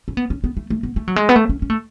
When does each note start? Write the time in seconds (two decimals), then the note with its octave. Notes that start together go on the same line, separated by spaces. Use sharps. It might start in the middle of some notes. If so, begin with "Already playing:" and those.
0.08 C#4
0.17 B3
0.30 C#4
0.44 B3
0.57 A3
0.70 A3
0.83 B3
0.96 A3
1.08 F#3
1.16 G#3
1.29 B3
1.36 A3
1.49 C#4
1.62 C#4
1.70 A3